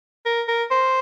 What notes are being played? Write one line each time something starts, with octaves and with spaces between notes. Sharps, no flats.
A#4
A#4
C5